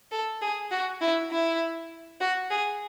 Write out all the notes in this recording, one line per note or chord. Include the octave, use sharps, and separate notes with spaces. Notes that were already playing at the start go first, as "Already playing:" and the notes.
A4
G#4
F#4
E4
E4
F#4
G#4